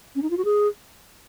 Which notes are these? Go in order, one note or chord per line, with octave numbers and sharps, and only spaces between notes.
C#4
D#4
F4
F#4
G#4